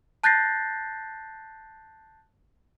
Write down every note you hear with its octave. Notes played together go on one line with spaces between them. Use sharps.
A5 F#6 G6 A6 A#6 C7